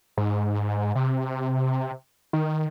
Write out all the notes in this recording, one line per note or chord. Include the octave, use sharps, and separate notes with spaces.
G#2
C3
D#3